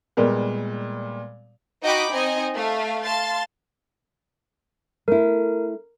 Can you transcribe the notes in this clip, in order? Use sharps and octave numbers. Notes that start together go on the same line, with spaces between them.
A#2 G3 G#3 A#3 B3
D#4 F#4 D#5 G5 B5 D6
C4 D#4 D#5 G#5
A3 F5
F5 A5 C6 A6
A3 E4 A#4